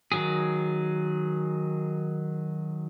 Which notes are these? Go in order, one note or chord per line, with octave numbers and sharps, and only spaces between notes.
D#3 F#3 G#4